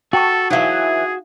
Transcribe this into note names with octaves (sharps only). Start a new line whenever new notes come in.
F#4 A4 G5 A5 C#6
E3 F#3 D#4 G#4 F5 F#5